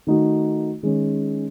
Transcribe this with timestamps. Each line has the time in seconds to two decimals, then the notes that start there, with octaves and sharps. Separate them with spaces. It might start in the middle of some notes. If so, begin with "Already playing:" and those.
0.07 D#3 A3 D#4 F#4
0.83 D#3 G#3 C#4